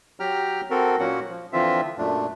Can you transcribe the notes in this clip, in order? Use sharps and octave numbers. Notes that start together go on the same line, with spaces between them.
F#3 G4 G5 A#5 F6
C4 F#4 A4 A#4
A#2 F#3 A#3 C#4 F#4 F#5
F3
D3 E3 F3 C4 F4 E5
F#2 A#2 A3 D4